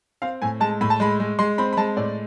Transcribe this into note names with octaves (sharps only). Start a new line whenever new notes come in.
C4 F5
A2 G#5
G#3 A5
A2 B5
A5
G#3 B5
G#3
G#3 C6
C4 B5
B5
G#3 A5
A2 D5